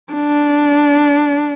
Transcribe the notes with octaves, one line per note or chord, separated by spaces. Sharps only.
D4